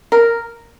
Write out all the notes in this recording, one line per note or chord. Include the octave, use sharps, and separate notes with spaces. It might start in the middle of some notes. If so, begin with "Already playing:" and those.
A#4